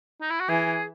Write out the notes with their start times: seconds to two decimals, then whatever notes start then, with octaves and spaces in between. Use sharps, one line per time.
0.21 D#4
0.31 E4
0.40 F#4
0.49 E3 G#4